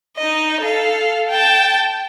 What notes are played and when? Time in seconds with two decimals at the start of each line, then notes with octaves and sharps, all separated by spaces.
0.17 D#4 D#5
0.61 A4 F5
1.29 G5 A5